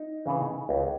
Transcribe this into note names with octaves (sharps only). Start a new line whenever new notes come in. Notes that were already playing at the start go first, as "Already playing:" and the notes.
Already playing: D#4
C#3 E3
C#2